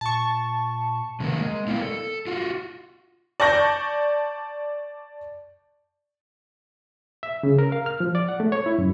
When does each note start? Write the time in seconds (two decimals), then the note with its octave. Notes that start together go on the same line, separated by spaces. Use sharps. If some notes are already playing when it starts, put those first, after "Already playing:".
0.01 A#2 A5 C#6
1.20 C3 D#3 G#3 A#3 A#4
1.40 G#3
1.67 B3 E4 A#4 D5 F5 G5
1.82 A4
2.27 F4 F#4
3.40 D5 A5 C#6 G6 A#6
7.23 E5
7.43 C#3
7.58 A#4
7.72 F5
7.86 F6
8.00 F3
8.15 D5
8.28 F#5
8.40 A3
8.52 C#5
8.66 E4
8.79 F#2